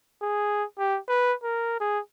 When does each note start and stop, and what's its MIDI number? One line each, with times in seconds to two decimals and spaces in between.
0.22 0.64 68
0.78 0.99 67
1.09 1.34 71
1.43 1.77 70
1.80 1.99 68